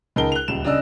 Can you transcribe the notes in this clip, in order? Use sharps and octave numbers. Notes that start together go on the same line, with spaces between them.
C#2 D#4 A#4 A5 G7
F#6 F7
D#1 C#2 E7
C#3 D4 D5 D#5 E6